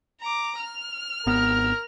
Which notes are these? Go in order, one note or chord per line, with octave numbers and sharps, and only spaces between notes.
A#5 D6
F6
G#1 B3 A#4